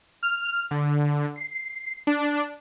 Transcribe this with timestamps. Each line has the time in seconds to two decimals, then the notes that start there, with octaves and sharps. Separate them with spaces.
0.23 F6
0.71 D3
1.36 C7
2.07 D4